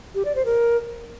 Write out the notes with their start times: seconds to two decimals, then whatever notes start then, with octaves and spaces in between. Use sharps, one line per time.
0.15 G4
0.25 D5
0.35 C5
0.45 A#4